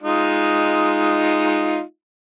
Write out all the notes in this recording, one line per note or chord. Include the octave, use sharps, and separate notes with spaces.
G#3 D#4 F4